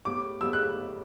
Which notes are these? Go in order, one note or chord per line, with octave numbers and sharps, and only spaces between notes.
A2 G3 B3 D6
A2 G3 B3 E6
F#6